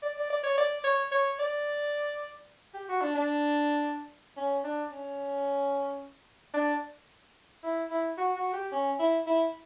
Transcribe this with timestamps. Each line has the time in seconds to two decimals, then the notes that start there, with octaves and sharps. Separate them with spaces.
0.02 D5
0.17 D5
0.30 D5
0.43 C#5
0.58 D5
0.84 C#5
1.12 C#5
1.39 D5
2.74 G4
2.89 F#4
3.01 D4
3.15 D4
4.37 C#4
4.64 D4
4.91 C#4
6.54 D4
7.63 E4
7.91 E4
8.18 F#4
8.36 F#4
8.53 G4
8.72 C#4
8.99 E4
9.27 E4